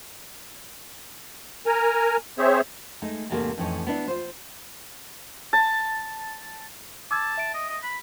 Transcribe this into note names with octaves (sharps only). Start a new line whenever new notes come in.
A#4 G#5 A#5
C4 G#4 C5 C#5 E5
G#3 A3 D#4
E2 G#2 C3 A3 A#3
F2 A2 E3 C#4 D#4
B3 D4 E4
F4 C5
A5
A5 D6 E6 G#6
E5 D7
D#5
D#5
B5